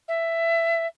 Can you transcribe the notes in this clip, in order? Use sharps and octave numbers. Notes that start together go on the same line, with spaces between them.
E5